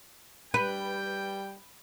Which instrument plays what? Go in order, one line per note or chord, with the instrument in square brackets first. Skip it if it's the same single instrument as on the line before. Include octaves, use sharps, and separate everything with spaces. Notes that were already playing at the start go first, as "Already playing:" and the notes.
[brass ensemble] G3 G5 [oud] B4